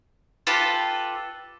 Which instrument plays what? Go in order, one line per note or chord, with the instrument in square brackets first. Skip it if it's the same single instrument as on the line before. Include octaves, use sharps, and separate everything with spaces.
[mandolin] F4 G4 A4 B4